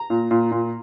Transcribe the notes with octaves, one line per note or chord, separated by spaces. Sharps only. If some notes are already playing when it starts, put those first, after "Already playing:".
Already playing: A#5
A#2
A#2
A#2